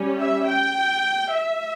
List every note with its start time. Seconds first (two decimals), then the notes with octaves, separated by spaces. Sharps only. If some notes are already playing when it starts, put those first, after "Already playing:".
Already playing: G3 C#4
0.20 E5
0.48 G5
1.32 E5